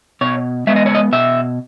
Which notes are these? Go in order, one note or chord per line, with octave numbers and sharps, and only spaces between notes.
B2 C#5
G#3 B3 E5
D#5
C#5
D#5
B2 E5